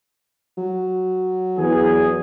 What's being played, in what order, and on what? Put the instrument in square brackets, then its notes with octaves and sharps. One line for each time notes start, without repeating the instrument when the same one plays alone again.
[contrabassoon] F#3
[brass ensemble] E2 G#4